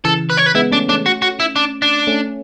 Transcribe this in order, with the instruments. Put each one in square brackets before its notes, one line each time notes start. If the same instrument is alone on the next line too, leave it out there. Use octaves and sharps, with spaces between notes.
[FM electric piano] C#3 E3 [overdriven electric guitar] A4
[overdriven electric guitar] B4
C#5
B4
[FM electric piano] G#3 B3 [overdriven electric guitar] E4
[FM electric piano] A3 C#4 [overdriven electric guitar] D4
[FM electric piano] A3 C#4 [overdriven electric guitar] D4
[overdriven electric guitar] F#4
F#4
E4
D4
D4
[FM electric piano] A3 C#4